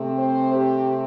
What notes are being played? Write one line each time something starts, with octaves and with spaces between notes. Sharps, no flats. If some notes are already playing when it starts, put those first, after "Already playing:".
Already playing: C3 A3 C4
C5
G4